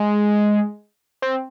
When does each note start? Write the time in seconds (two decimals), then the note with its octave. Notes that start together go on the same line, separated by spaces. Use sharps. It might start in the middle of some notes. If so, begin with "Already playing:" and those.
Already playing: G#3
1.22 C4